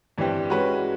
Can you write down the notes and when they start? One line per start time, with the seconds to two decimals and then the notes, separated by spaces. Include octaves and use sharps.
0.18 G2 E3 G3 C4
0.50 G#3 C#4 F#4 B4